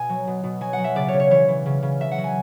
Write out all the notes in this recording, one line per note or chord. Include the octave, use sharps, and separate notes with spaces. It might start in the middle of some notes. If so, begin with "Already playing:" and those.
Already playing: B2 G#5
F#3
B2
B2
F#3 G#5
F#5
F#3
E5
C#3 D5
C#5
C#3
C#5
E3 C#5
E3
C#3
C#3
F#3 E5
F#5
F#3
G#5